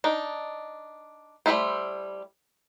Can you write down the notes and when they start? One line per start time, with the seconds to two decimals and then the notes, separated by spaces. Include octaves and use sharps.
0.04 D4 D#4
1.46 G3 A3 D#4 E4 C5